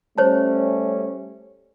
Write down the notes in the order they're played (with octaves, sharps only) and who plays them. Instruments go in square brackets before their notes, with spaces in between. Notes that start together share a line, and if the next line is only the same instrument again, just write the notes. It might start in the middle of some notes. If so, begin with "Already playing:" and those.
[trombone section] G3 A3 C#4 [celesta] C5 C#5 A5